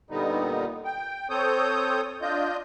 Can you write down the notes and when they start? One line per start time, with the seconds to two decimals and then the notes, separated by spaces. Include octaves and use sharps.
0.10 A#2 D3 G3 B3 D#4
0.85 G5
1.30 C4 A4 C#5 D#6 G6
2.22 D4 F4 D#5 G6